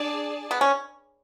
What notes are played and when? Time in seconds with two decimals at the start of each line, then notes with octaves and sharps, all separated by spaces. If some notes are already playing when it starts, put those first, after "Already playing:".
Already playing: D4 G#4 D5 A5
0.51 B3
0.61 C#4